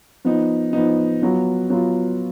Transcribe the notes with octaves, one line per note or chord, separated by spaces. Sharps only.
F3 B3 D#4
F3 B3 D#4
F#3 B3 F4
F#3 B3 F4